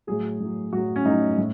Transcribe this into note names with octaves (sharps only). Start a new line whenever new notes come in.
A2 F#3 G#4
A2 F#3
A2 F#3 F#4
C#4
A2 F#3 D#4
A2